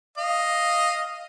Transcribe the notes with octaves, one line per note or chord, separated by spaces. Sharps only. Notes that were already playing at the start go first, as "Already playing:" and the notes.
D#5 F5